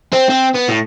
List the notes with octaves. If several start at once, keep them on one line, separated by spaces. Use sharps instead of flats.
C4
C4
B3
A2